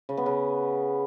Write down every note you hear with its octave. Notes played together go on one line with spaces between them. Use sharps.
C#3
B3
C#3